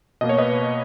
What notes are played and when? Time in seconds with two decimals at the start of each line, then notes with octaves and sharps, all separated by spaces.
0.21 B2 A#3 D#5
0.29 C#5
0.38 B4 D#5